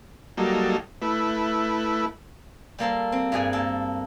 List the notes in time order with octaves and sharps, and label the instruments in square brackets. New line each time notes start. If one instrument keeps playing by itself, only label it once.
[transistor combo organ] F#3 G3 A#3 D#4 A4
A3 E4 B4
[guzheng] G3 A#3 A4 C5
C4
G2 A#2 G3 G#4 G#5
A#3 A4